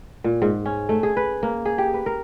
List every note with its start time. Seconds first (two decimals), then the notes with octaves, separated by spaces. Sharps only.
0.24 A#2
0.42 G#2
0.65 C#4
0.89 A3
1.03 G#4
1.17 B4
1.43 A#3
1.65 G#4
1.78 G4
1.94 B4
2.06 A#4